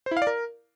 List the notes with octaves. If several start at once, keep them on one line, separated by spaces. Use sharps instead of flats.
C5
E4
F5
D5
A#4